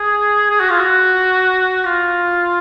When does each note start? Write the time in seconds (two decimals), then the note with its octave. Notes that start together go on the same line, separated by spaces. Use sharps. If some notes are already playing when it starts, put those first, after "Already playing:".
Already playing: G#4
0.51 G#4
0.60 F#4
0.70 F4
0.79 F#4
1.85 F4